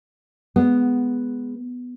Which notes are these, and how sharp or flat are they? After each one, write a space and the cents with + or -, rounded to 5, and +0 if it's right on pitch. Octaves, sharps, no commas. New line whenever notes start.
G#3 +0 B3 +0